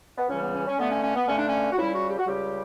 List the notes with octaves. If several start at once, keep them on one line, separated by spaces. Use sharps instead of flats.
B3
C#2 C#3 E3 G3 C#4
B3
C#4
C#4
G2 D3 A3 B3
C#4
C#4
B3
G2 D3 A3 C#4
D4
C#4
F#4
C#2 C#3 G3 E4
F#4
G4
F#4
C#2 C#3 G3 G4